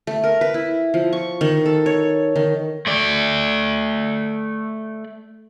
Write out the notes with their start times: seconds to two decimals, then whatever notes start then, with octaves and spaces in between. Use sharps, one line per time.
0.07 A3
0.24 A#4
0.41 B4
0.54 E4
0.94 F3
1.13 C#6
1.41 D#3
1.66 A4
1.86 C#5
2.36 D#3
2.87 A3 D5